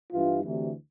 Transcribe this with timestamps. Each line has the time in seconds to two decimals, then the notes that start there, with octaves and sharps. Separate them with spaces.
0.12 G2 E3 F4
0.42 D2 C3 E3